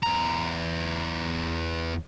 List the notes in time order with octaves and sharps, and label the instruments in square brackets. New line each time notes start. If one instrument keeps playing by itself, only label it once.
[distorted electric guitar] E2 A#5